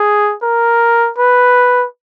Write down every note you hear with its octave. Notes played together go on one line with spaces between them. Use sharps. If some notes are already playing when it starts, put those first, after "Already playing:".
Already playing: G#4
A#4
B4